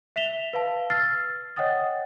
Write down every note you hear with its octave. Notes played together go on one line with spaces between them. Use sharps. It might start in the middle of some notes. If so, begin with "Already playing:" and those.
E5 B6 E7 F7 G7
B4 F5 A5
E6 F6 A6 C7
C#5 D#5 F#5 G5 D#6 A6